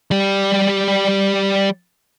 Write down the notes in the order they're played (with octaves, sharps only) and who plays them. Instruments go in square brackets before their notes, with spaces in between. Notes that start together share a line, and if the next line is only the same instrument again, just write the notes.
[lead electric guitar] G3 G4